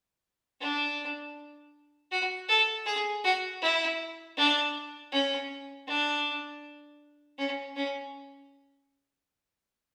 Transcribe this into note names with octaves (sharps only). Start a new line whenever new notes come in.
D4
F#4
A4
G#4
F#4
E4
D4
C#4
D4
C#4
C#4